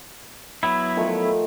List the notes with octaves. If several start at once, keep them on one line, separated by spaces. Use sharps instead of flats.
F#3 B3 E4
D#3 F3 A3